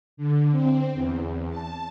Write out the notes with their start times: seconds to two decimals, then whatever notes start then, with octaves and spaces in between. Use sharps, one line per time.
0.17 D3
0.51 C4
0.94 E2
1.50 A5